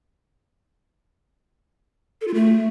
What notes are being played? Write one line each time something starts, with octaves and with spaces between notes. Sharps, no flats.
A4
F4
A3